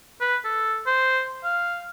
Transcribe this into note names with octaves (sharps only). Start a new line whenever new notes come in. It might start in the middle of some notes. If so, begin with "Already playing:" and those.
B4
A4
C5
F5